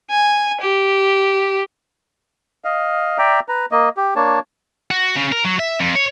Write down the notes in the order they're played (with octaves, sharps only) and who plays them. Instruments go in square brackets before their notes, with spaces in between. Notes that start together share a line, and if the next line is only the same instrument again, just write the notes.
[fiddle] G#5
G4
[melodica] D#5 F5
D5 E5 G5 A#5
B4 A#5
A#3 D#5
G4
A#3 D4 C#5 A5
[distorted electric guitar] F#4
C#3
A#4
F#3
E5
F2
C#5